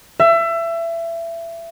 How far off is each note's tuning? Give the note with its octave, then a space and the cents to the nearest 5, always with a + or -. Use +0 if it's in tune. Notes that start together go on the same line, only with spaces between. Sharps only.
E5 +25